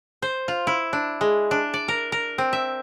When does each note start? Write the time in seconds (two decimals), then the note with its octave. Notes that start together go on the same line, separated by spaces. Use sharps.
0.22 C5
0.48 F4
0.67 E4
0.93 D4
1.21 G#3
1.51 D4
1.74 D5
1.88 A#4
2.12 A#4
2.38 C4
2.53 E5